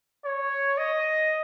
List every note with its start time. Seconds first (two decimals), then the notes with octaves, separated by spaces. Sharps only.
0.25 C#5
0.78 D#5